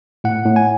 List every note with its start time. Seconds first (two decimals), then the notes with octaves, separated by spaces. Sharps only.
0.24 A2 F#5
0.45 A2
0.56 G#5